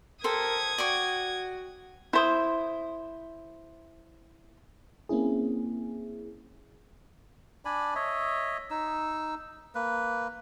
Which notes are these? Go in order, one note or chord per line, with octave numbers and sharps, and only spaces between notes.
G4 A4 A#4 C5 D#6 G#6
F#4 D5 G5 C#6
E4 C5 D#6
A#3 C4 C#4 E4 G#4
D4 D5 G#5 B5
C#5 D#5 E5
D#4 E6
A#3 B4